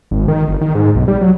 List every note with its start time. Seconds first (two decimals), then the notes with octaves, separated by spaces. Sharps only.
0.11 G#1
0.28 D#3
0.48 G1
0.61 D#3
0.75 G#2
0.95 B1
1.08 G3
1.21 F#3